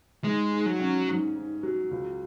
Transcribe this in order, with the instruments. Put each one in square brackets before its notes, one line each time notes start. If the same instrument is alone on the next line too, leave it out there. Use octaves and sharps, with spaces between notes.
[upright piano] G#2 [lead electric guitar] G#3
[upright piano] G#2
[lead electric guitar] F#3
[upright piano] C#4
G#2
G#2
F#3
C#2